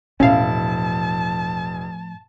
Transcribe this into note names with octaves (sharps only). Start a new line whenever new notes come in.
E1 A2 F3 C#4 E4 F5 A5